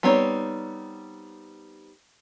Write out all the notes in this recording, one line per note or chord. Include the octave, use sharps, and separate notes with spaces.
G3 B3 C4 D#4 C#5